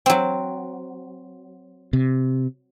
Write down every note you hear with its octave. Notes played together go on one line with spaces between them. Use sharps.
F#3 C4
C3